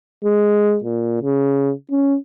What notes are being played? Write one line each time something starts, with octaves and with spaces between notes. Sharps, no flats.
G#3
A#2
C#3
C#4